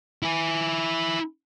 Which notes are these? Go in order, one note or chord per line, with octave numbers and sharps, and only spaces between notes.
E4 G#5